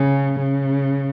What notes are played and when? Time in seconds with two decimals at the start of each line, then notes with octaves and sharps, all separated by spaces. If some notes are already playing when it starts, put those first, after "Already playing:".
Already playing: C#3
0.39 C#3